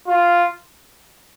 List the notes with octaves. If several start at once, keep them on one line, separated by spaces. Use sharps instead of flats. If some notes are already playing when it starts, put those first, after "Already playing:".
F4